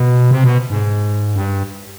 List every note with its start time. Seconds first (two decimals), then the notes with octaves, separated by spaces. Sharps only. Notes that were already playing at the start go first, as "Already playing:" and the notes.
Already playing: B2
0.31 C3
0.44 B2
0.70 G#2
1.36 G2